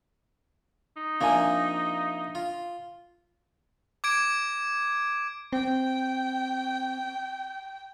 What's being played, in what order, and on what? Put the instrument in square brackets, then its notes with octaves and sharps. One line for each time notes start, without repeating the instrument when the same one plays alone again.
[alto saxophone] D#4
[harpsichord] C3 F3 A#3 [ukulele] D4 A#4 G#5
[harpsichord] F4
[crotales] D6 G#6 D7
[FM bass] C4 [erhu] G5